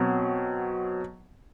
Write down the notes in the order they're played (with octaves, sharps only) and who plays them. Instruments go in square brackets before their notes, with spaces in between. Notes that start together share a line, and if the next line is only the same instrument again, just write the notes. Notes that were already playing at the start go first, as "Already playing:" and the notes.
Already playing: [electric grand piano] B2 F#3 C4